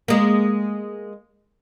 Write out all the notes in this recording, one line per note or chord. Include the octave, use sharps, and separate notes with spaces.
G#3 A#3